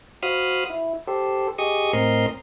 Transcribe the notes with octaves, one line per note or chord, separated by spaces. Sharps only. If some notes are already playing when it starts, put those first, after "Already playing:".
F#4 C5 F5 B5 D#6 F6
E4
G4 A4 C5
G4 G#4 D#5 C#6 D#6
A2 C4 A#4 D#5 A#5 C6